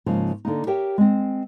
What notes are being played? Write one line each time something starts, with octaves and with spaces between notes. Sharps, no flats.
G#2 C#3 F3 A#3
D3 A#3 D#4
G4 A#4 C#5 E5 G5
G#3 C4